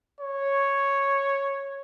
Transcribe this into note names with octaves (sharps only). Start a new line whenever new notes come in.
C#5